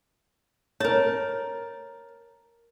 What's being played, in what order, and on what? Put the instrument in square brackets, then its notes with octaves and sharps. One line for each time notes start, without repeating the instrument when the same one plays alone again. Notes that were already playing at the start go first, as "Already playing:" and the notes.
[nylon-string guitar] A#4 A5 [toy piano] C#5